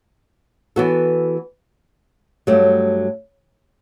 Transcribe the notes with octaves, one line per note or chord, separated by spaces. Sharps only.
E3 B3 F#4 A4
G2 F#3 A3